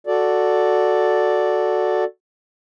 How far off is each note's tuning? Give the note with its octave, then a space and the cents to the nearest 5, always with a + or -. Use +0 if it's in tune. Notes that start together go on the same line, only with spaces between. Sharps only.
F#4 -5 A4 +0 D5 +0